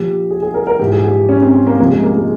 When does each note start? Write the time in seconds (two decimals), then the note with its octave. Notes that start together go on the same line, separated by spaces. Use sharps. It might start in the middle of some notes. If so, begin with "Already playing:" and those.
Already playing: A#1 A#2 F3 G4
0.30 G#4
0.42 G#4
0.54 A#4
0.67 A#4
0.79 A#1 G#2 E3 G4
0.93 G#4
1.05 G4
1.29 C#4
1.42 C4
1.67 A#3
1.79 C#2 C3 F3 A#3
1.91 G#3
2.03 A#3
2.17 G#3